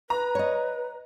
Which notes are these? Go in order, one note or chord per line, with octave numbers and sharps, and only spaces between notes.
B4 A#5
C#5 D#5